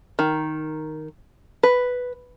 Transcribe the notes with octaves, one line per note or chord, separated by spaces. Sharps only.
D#3
B4